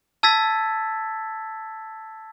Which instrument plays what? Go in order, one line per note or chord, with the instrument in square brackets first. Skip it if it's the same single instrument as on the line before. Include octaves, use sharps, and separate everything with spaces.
[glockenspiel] A5 E6 G#6 A6 B6